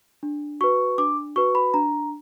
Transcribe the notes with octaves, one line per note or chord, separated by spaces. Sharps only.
D4
F#4 B4 C#6
D4 D6
F#4 B4 C#6
B5
D4 A#5